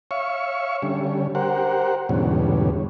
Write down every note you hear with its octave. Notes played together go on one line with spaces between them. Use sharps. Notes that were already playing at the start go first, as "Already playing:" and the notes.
C#5 E5 F5 C#6
D3 G3 C#4
G4 A#4 C5 F#5
E2 G#2 B2 D3 G3 C#4